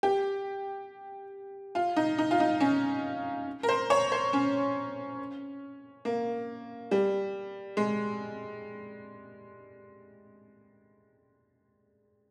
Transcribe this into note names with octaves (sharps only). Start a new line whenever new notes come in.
G4
F4
D#4
D#4
F4
D#4
C#4
A#4
C5
C#5
C5
C#4
A#3
G3
G#3